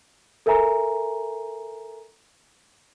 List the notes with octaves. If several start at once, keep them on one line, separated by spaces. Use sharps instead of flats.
A4 A#4 E5 G#5 A#5